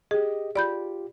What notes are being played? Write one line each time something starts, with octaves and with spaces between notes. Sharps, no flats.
G4 G#4 D#5
F4 G4 D5 B5 G6